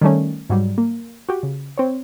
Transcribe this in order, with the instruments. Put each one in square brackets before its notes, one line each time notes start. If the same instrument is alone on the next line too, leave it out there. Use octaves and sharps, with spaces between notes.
[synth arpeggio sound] D#3 G3 A3 C#4
G#2 F#3 G3
A#3
F#4 G4
C#3
C4 C#5